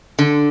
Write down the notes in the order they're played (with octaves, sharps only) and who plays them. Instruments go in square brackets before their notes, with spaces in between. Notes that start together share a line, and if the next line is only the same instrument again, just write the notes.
[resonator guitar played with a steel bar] D3